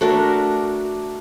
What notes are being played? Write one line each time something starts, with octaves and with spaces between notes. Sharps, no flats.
A3 D4 F#4 A#4